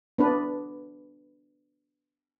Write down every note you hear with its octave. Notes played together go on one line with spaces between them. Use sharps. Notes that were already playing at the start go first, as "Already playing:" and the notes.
B3 D4 B4